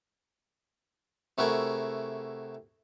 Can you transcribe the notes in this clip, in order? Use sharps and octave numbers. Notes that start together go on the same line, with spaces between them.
C3 A3 E4 F#4 G#4 A#4